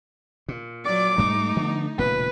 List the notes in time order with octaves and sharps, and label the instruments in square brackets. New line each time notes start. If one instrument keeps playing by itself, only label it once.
[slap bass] A#2
[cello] F#3 D5 [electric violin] D6
[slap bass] G#2 G3 [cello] A3 D#4
[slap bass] D3 F3 B3
[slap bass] E1 A#2 C#3 [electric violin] B4